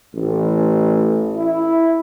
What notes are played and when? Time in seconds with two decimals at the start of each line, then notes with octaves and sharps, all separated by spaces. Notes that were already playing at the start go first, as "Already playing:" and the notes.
0.15 A1
1.37 E4